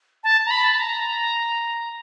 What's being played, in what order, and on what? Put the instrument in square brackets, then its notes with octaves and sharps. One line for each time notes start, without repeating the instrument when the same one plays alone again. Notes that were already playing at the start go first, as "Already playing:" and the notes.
[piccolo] A5
A#5
B5
A5
A#5